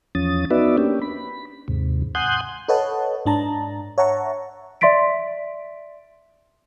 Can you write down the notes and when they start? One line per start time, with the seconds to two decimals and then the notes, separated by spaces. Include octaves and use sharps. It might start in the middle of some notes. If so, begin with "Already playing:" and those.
0.15 E2 F3 C#4 D#6 A6
0.51 B3 D#4 F#4 B4 D5 E5
0.78 A#3 C#4 D4 G4
1.02 B5
1.68 D#2 G#2 C3
2.15 F#5 G#5 C6 D#6 F#6 G6
2.68 A4 B4 C#5 D#5 F#5 A5
3.26 G#2 D4 A5 A#5
3.98 C#5 E5 F#5 A5 A#5 C#6
4.81 D5 E5 C6 A6 B6 D7